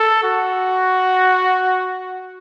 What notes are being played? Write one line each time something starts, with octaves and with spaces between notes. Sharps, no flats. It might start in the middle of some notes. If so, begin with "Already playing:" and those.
Already playing: A4
F#4